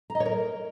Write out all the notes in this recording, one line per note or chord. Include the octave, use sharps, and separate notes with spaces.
A#5
D#5
C#5
A#4